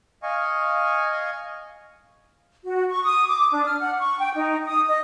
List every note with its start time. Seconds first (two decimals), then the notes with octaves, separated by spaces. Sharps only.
0.23 D#5 F5 G#5 C#6
2.65 F#4
2.89 C#6
3.03 D#6
3.27 D6
3.53 D4
3.65 F6
3.80 F#5
3.99 C#6
4.19 G5
4.36 D#4
4.66 D#6
4.88 D#5